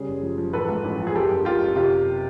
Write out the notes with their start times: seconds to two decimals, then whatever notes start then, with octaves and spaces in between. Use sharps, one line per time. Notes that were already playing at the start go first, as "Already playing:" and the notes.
Already playing: C#3 G3 G#4
0.08 F#1
0.23 F3
0.38 F3
0.53 A1 A4 B4
0.68 G#2
0.85 A1
1.00 F3
1.07 G#4
1.15 F#1 G4 A4
1.31 F#1
1.45 F#1 F4 G4
1.61 F#1
1.76 C3 F4 G4
1.91 F#1